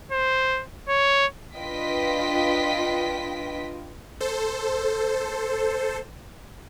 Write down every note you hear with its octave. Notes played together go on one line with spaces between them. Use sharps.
C5
C#5
D4 F4 B4 D#5 G5 B6
A4 C5